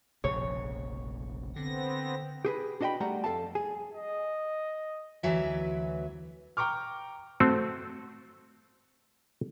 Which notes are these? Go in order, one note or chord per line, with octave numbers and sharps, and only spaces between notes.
F1 A#1 C#3 C#5
D3 B3 C4 A#6
G4 G#4 B4
D4 F#4 D#5 E5 G5 B5
G3 A3 F#5 A#5
F2 A4 F5 A5
G#4
D#5
D2 E3 F#3 B4 E5
G5 A#5 C#6 D6 F6
A3 C4 F#4 A4